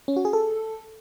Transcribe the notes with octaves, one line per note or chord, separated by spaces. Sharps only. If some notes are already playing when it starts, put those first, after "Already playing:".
C#4
F#4
G#4
A4